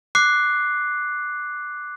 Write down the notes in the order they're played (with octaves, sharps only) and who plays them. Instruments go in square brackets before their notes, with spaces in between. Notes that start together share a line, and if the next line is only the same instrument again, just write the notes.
[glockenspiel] D6 F#6 C7